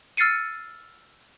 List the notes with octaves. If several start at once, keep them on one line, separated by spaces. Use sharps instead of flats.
E6 F6 A6 C7 C#7 D#7